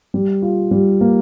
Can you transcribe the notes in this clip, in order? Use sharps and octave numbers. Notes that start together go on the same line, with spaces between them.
G3
F4
G3
A#3